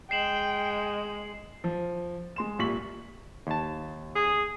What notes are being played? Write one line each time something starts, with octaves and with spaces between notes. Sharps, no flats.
G#3 G5 C7 E7 F#7
F3
G#3 C6 E7
C2 A#2 F4 C#6 B6 F#7
D#2 A5
G#4